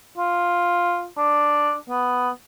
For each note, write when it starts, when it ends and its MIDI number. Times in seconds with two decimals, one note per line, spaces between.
0.18 1.06 65
1.17 1.75 62
1.89 2.30 59